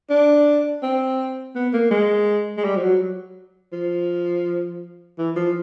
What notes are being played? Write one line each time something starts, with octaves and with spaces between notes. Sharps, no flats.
D4
C4
B3
A#3
G#3
G#3
G3
F3
F#3
F3
E3
F3